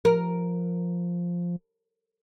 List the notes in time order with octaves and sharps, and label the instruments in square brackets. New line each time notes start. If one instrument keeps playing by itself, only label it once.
[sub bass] F3 [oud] A#4